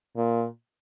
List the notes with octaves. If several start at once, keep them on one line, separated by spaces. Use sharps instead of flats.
A#2